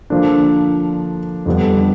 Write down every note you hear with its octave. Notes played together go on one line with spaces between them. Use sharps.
D3 F3 A#3 D4
F2 D3 G3 B3 D4